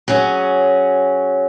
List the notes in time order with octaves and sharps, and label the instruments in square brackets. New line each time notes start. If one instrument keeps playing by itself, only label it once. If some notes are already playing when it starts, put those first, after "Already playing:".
[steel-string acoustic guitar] F#3 C#4 G#4